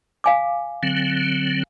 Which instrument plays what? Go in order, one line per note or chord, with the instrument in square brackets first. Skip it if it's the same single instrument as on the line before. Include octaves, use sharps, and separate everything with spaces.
[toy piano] F5 G#5 D6
[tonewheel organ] D3 F#3 C4